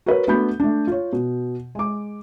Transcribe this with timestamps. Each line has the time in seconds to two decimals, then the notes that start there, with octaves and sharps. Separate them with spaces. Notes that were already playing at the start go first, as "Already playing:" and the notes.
0.06 F#4 A#4 B4 C#5
0.27 A3 B3 D4 F#4 B5 G6
0.60 A3 D4
0.87 F4 C#5
1.13 B2
1.75 G#3 D6